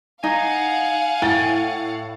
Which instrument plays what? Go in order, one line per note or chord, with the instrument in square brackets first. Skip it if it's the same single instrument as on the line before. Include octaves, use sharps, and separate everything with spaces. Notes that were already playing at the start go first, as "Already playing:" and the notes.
[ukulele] D#4 [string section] F5 F#5 [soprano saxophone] G#5
[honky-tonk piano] A2 A6 [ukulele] G5